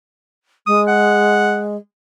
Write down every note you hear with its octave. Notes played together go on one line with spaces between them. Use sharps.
G#3 D#6
F#5